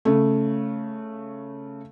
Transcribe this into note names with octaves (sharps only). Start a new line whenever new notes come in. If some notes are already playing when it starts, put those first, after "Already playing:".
C#3 A3